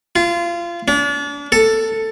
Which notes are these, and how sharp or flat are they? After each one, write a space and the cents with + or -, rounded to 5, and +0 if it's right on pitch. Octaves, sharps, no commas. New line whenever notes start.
F4 -25
D4 -35
A4 +10